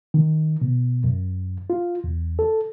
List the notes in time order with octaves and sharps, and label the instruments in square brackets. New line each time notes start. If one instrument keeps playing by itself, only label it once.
[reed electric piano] D#3
B2
F#2
F4
E2
A4